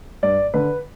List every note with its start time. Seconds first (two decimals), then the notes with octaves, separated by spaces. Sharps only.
0.23 G2 D5
0.54 D3 B4